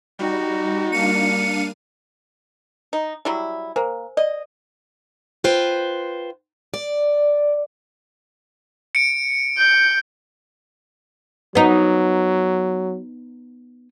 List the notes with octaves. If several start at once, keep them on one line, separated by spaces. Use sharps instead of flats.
G3 D#4 F#4
G3 A#3 D4 F5 C#7 D#7
D#4
F#3 G3 E4
A#3 A#4 C5 G#5
D5 D#5
F4 B4 C5 G5
D5
C#7 D7
G6
F#3 B3 D#4